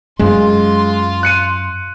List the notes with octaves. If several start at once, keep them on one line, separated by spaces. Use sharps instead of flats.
F#2 G#3 D#4 F4 C6
F#6 C#7 D#7